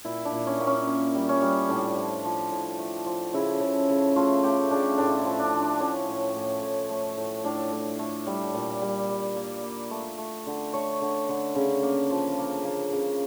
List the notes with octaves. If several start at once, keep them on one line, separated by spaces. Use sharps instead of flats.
A#2 E4
D4
A#2
C#4
A#3
C#4
A#3
G3
C#4
G3
A2 D4
F3
F3
A2
A3
F3
C#3 E4
C#3
C#3
A3 F4
A3 G4
C#3 D4
A2 D4
E4
F3
D4
F3
D4
A2 C#4
A2
A2
A2
A3
A2
A2 D4
A2
A3
G3
A#2
G3
G3
A#3
A#3
A3
A3
D3
A3 C#5
D3
D3
C#3
A#3
F3
A#3
A#3
C#3